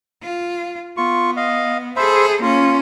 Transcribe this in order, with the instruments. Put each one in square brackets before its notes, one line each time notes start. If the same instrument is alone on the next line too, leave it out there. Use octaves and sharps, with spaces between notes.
[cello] F4
[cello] B3 [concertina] F4 C#6
[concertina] D#5 F5
[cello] G#4 A4 [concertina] C5 E5 B5
[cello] A#3 C#4 [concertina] F4